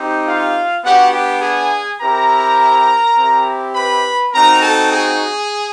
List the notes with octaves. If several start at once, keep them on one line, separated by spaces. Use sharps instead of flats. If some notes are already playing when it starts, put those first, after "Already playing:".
Already playing: C4 D#4 G4
F4 F5
B3 D4 F#4 G4 F#5
G4 G5
G#4 G#5
C4 E4 G4 A#4 A#5
C4 E4 G4
B4 B5
C4 D#4 F#4 A#4 A#5
A4 A5
G#4 G#5